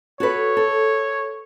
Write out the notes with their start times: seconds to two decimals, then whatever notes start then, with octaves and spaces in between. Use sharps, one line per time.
0.20 F#4 A4 B4 C#5
0.57 A4